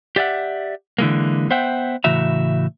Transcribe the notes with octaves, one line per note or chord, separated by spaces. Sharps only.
G4 D5 E5 F#5
D3 E3 G#3 A#3
B3 C5 E5 F#5 G5
A2 C#3 E3 F#4 E5 A#5